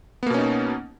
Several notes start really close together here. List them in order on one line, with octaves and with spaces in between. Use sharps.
B3 A#3 B2 C#4 D#4